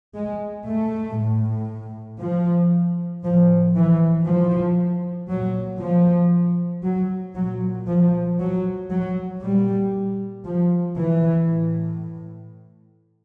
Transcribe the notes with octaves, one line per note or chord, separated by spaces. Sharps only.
G#3
A3
A2
F3
A2 F3
E3
F3
A#2 F#3
F3
F#3
A#2 F#3
F3
F#3
F#3
A#2 G3
F3
E3
A2